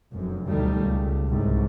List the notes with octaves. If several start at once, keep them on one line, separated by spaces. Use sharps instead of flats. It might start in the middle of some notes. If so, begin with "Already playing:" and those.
F1 F#2
D2 B2 D#3 G3 A3
C#2
C2 G#2